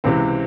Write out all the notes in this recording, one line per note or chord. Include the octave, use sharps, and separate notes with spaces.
C#2 C3 E3 C4